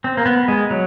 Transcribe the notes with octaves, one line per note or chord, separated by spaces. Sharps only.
C4
A#3
B3
G#3
F#3